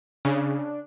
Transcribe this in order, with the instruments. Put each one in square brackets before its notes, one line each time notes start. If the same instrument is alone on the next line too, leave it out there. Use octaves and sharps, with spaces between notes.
[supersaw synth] C#3 [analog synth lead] D4